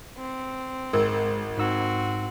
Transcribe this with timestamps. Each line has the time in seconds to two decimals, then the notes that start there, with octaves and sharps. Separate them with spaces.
0.18 C4
0.93 G#1 G#3 A#4
1.58 G#2 C4 D#4 F#4 E6